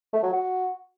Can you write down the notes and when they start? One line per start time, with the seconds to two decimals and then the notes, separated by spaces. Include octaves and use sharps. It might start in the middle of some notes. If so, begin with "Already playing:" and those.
0.13 A3
0.23 F#3
0.33 F#4